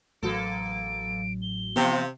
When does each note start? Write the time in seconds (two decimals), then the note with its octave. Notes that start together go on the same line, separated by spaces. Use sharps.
0.23 A1 F#3 A#3 B3 A4 D7
1.42 G7
1.76 C3 E3 F3 B3 F4